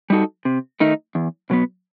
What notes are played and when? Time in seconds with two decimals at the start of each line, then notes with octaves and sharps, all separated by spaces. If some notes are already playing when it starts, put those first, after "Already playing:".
0.10 G3 D#4 F#4 A4
0.45 C3
0.80 D#3 A3 D#4
1.15 E2
1.50 B2 F#3 B3